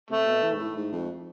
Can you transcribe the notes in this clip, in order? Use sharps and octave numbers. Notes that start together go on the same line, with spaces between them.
C3 A3
B2
E3
G#2
A2
G#2
F2